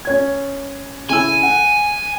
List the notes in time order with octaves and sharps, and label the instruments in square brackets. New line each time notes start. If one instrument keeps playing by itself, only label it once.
[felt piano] C#4 C#5 G#6
[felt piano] C#3 E4 E6 [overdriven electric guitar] G#5
[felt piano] F#5